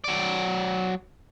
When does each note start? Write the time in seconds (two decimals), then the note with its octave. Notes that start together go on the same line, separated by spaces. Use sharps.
0.04 F#3 D5